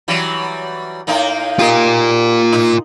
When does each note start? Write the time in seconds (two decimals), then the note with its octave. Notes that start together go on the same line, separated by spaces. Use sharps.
0.08 E3 F#3 G3
1.07 A2 A#3 D#4
1.59 F4 G4 A#4 D#5
2.53 D#4